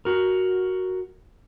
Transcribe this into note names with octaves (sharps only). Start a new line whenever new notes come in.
F#4 A#4